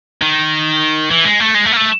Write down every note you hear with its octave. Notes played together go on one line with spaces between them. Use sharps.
D#3
E3
G#3
A3
G#3
A3
A#3
A3